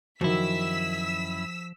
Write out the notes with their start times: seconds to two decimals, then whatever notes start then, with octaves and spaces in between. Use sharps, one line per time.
0.21 F#2 D#3 F3 F#3 E4 E6 B6